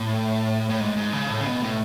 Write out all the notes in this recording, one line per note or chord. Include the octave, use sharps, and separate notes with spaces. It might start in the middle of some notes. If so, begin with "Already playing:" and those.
Already playing: A2
A2
G#2
G#2
C#3
A2
C#3
B2
A2